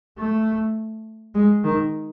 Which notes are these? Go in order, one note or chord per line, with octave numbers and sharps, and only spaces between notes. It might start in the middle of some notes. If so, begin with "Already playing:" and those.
A3
G#3
D#3